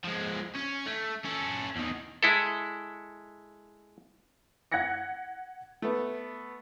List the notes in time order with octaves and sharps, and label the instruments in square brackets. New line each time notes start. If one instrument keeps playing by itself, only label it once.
[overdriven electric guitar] F3 G#3
C#4
A3
C#4 A4
E2 D#3
[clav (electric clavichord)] G#3 E4 A4
[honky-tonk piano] F#5 F#6 G#6 A#6 C#7
[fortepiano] A3 B3